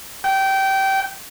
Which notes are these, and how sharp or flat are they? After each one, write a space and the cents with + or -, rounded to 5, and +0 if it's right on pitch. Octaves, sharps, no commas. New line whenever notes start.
G5 -20